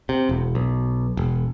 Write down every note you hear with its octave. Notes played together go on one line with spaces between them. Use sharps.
C3
E1
B1
E1